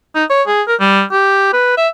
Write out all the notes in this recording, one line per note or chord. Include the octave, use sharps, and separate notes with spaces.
D#4
C#5
G#4
A#4
G3
G4
B4
E5